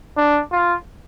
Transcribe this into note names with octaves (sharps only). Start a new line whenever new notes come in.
D4
F4